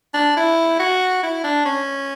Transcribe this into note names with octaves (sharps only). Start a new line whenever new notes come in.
D4
E4
F#4
E4
D4
C#4